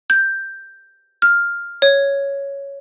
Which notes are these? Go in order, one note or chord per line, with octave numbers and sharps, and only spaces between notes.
G6
F6
C#5